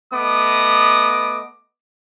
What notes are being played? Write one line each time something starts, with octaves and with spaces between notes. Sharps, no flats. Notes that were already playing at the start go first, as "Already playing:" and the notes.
A3 B3 D#5 D6 D#6